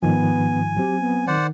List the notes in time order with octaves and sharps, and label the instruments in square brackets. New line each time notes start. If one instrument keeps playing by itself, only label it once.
[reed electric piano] G#2 D#3 F3 [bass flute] B3 [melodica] G#5
[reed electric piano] F#3 C4 [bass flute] G4
[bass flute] B3
[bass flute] D#3 [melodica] C5 D5 F#5